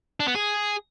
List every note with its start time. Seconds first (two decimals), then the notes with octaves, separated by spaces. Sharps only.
0.20 D4
0.28 B3
0.35 G#4